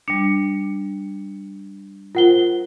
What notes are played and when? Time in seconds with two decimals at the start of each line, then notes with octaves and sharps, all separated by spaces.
0.08 G3 D4 C#7
2.15 F4 A#4 C5 F#5 G7